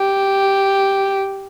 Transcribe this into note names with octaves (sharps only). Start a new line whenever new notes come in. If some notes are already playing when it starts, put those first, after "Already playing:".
Already playing: G4